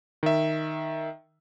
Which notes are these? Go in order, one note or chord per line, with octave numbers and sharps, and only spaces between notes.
D#3 E5